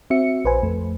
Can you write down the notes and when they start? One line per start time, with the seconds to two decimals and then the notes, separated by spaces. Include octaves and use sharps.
0.10 C4 F#4 E5 C#7
0.45 A#1 B4 C5 G#5
0.63 F2 A3